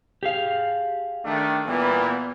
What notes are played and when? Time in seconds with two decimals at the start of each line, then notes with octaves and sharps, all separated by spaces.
0.23 G4 G#4 F5
1.25 D#3 A3 D4
1.67 A#2 E3 G3 B3